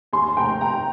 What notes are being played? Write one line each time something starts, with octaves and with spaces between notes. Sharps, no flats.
D#2 G#5 C6
F1 G5 A#5
D#2 G5 A#5